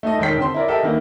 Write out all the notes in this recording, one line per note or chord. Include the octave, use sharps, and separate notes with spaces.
A3 D#4 A4 D#5
E1 D#3 G5 B6
D3 C4 C5 C6
E4 A#4 D5
G4 A4 A#4 D#5 E5
D#3 E3 A#3 B3 D4 E4